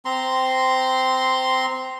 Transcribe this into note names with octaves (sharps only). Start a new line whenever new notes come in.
C4 A#5 C6